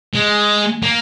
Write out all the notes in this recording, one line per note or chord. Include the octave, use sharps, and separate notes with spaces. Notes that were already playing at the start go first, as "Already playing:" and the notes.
G#3
A#3